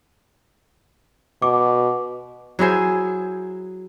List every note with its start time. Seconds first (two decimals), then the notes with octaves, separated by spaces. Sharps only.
1.42 B2 D6
2.59 F#3 E4 G#4 C5